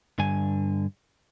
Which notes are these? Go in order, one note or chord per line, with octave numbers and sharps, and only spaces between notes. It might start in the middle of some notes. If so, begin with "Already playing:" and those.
G2 D3 G#5